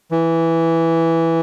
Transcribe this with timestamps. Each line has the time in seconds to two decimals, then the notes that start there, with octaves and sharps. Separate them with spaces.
0.11 E3